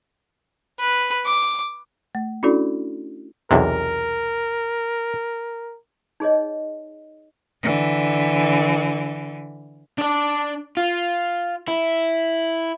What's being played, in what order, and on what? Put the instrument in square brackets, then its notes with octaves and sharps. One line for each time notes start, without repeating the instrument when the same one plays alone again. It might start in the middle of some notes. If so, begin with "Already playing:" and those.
[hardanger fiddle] B4
D6
[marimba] A3
C#4 D4 E4 F#4 A4 D5
[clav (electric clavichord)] B1 E2 C3 [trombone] A#4
[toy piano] D#4 G#4 C#5 D#5
[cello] D3 E3
[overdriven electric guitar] D4 D5
F4
E4